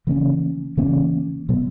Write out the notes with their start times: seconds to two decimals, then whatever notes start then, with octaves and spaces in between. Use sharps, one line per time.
0.07 C#3 E3 A#3 C#4
0.77 C#3 E3 A#3 C#4
1.49 B2 F#3 B3